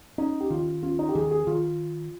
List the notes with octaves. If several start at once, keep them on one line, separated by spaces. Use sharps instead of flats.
C#4 D#4
G4
D#3 F4
C#4 F4
D#4
G4
D#3 G#4
G#4
D#3 F4